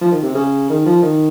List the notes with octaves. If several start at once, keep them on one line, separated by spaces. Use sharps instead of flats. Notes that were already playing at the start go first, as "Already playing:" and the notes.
F3
D#3
C3
C#3
D#3
F3
D#3